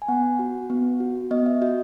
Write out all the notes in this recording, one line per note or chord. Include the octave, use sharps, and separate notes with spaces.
G#5
B3 F#5
F#4
B3
F#4
B3 D#5
E5
F#4 D#5